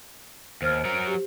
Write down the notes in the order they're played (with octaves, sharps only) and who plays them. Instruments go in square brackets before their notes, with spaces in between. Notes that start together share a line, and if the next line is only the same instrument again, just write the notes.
[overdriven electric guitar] D#2 [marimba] C5 F6
[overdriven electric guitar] F#3 A#4
[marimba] G4